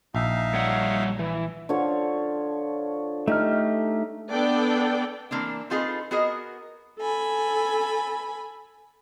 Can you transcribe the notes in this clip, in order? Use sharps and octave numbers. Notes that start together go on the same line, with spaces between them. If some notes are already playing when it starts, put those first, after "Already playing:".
A#1 D#4 E5 F5
G3 C#5 F#5
E3
D3 F3 C#5
A3 D#4 G4 F6
B3 D4 A4 D5 G5
E3 A#3 C4 D4
C4 D#4 F4 G#4 A4 B4
B3 F#4 G#4 A#4 D#5
A4 G#5 B5